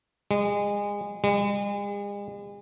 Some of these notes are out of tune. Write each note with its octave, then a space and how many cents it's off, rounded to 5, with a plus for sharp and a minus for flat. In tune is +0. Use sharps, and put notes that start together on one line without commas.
G#3 -25
G#3 -40